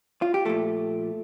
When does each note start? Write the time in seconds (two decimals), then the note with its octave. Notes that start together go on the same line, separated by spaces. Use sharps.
0.22 F4
0.34 G4
0.45 A#2 F3 A3 A4